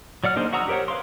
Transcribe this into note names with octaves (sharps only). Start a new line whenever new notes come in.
F#3 D5 F#5 F6
A#3 D4 D#4 G#4 C5
F#4 F#5 A#5 D#6 E6
G4 A#4 C5 C#5 F#5
B4 F5 C6